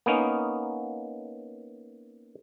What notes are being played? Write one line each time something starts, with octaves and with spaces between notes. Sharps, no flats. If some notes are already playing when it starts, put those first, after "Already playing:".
A#3 B3 C#4 D#4